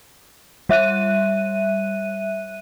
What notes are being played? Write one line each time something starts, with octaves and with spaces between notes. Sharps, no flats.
G3 E5 F#6 D#7